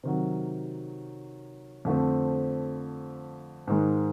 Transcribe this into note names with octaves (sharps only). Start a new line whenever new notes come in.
C3 D#3 F#3
F2 D3 F3 A3 C4
G#2 D#3 G#3